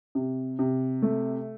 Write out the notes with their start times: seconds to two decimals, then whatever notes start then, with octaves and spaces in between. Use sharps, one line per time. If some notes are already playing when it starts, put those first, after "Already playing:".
0.15 C3
0.59 C3
1.02 A3